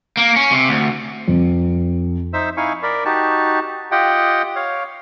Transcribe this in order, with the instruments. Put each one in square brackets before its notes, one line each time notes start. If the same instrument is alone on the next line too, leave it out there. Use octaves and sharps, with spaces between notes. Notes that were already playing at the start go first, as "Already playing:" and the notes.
[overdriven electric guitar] A#3
C#4
C3
D2
[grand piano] F2
[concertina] D#4 C5 E5 E6
D#4 E4 F5 G#5 C#6
A#4 D5 B5
D#4 F#4 G4 A5
F4 G4 D#5 F#5 G5
C#5 F5